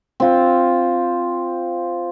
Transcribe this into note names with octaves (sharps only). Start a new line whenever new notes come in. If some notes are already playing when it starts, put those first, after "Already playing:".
C4 F4